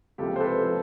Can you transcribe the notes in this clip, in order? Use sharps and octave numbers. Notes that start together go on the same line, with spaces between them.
C#2 C3 F3 G#3 G4 A4
C5
A4 B4
F3